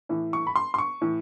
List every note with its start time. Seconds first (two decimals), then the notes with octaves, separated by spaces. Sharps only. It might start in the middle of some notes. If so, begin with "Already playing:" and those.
0.09 A2 E3
0.33 C#6
0.47 B5
0.56 C6
0.74 C6
0.78 C#6
1.02 A2 E3